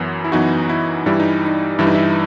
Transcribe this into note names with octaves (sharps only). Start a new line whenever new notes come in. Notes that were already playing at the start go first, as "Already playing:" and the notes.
Already playing: F#2 E3 B3 E4
E4
F#2 E3 B3 D#4 F#4
E4
G2 E3 G3 E4
D#4
D#4
G2 E3 G3 E4
D#4
E4